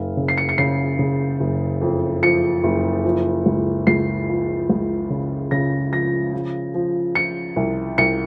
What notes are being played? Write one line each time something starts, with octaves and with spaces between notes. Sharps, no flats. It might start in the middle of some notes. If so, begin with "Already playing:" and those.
Already playing: F#1 F5
C#3
C7
C#7
C#7
C#3 C7
C#3
F#1
F2
F3 C#7
F#1
F3
C#2
C#2 C7
F3
C#2
C#3
C#3 A#6
F3 A#6
F3
F3
F3 C#7
C2
C2 C#7